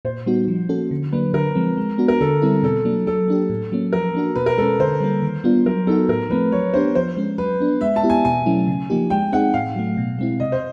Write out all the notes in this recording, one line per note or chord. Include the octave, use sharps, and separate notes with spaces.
A#2 C5
G3 B3 D#4 F#4
F3
A#3 C#4 F#4 A4
D3
F#3 A#3 D4 B4
D3 A#4
F3 G#3 C4
G#3
B3 D4 F#4
A#4
D3 A4
G3 C4 E4
B2 A4
F#3 A#3 D4
F#3 A4
A#3 D4 G4
A2
F#3 A#3 C#4
F3 A#4
A#3 D4 F#4
B2 B4
A#4
G#3 C#4 A4
D3 C5
G3 A#3
D#3
G3 B3 D4 F4
F#3 A#4
B3 D#4 F#4 A4
A2 A#4
F3 A3 C4 B4
F#3 C#5
B3 D4 G4 C5
F3 C5
G#3 C#4
F#3 B4
B3 D4
G#3 E5
A5
B3 E4 G4
G#5
B2 G#5
F#3 A3 C#4 E4
C#3
F3 A#3 D#4 G4
G#3 G5
C4 D#4 G#4 F#5
A2 F5
F#3 A3
B2
G#3 C4 E4
C3 D#5
C5